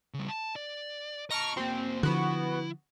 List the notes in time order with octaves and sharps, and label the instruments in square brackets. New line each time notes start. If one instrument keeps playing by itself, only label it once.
[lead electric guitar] C#3 G3
A5
D5
[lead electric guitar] D#5 A5 [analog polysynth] A#5 C#6 F6
[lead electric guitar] A#3 F#4 [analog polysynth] C4
[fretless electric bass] D3 F3 [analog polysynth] B3 F#4 [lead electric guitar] E4